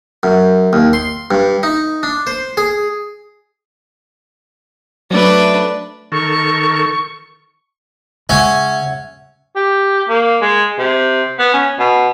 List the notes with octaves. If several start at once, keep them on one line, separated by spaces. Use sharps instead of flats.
F#2
D#2
C6
G2
D#4
D4
C5
G#4
F#3 A3 D4 B4
D#3 A4 A#4 C#6
C#3 G#3 C#4 E5 F#5 G#6
G4
A#3
G#3
C3
B3
C#4
B2